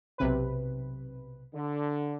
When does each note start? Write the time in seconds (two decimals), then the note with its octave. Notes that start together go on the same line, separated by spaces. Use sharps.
0.18 B1 C3 B4
1.53 D3